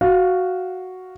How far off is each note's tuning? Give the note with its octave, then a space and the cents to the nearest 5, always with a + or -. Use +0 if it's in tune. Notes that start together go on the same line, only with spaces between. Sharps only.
F#4 +0 F5 +0